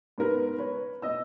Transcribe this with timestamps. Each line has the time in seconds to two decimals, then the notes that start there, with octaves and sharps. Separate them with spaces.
0.18 G#2 B3 A#4 B4
0.58 B4 C#5
1.02 B2 D#5 E6